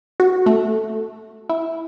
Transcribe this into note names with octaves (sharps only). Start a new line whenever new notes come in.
F#4
A3
E4